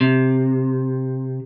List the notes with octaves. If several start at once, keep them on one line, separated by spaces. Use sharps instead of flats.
C3